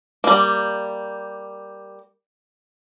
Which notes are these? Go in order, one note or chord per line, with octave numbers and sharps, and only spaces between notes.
G3 A#3